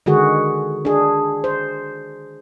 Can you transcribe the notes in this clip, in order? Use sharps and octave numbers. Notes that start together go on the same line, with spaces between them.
D3 D#3 G#3 F#4 G#4
D4 G#4
C5